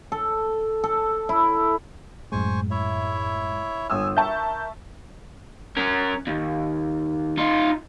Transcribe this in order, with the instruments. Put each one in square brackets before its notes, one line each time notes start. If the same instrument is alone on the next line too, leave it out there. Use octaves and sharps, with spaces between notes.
[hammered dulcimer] A4
A4
E4
[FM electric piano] F#2 A2 G#3 [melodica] C5 G#5 C#6
[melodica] E4 C#5 E5
[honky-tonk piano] G1 D#6 E6 [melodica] G#5
[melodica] A#4 [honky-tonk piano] E5 A5 C#6 [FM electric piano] G6
[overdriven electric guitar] C#4 A#4
D#2
D#4 F4